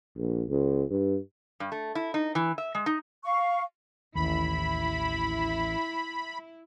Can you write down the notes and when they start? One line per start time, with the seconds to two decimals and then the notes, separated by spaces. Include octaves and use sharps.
0.16 A#1
0.49 C#2
0.90 G2
1.60 G2
1.72 A3
1.95 E4
2.14 D#4
2.35 E3
2.58 E5
2.75 G#3
2.86 D#4
3.24 F5 C#6
4.16 A1 D#2 E4 B5